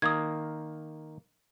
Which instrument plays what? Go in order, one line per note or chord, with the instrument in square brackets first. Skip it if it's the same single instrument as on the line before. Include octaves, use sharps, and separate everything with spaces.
[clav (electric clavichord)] D#3 A#3 [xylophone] D#6 G#6